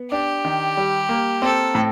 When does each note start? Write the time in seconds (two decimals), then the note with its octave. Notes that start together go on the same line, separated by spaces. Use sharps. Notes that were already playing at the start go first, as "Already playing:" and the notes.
Already playing: B3
0.11 D4 G4
0.45 D#3
0.77 G3
1.09 A#3
1.42 C4 A4
1.75 A2